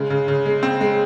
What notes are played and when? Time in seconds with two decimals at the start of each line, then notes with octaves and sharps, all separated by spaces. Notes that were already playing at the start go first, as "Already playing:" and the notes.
Already playing: C#3 G#3
0.10 C#3
0.28 C#3
0.46 G#3
0.63 C4
0.81 G#3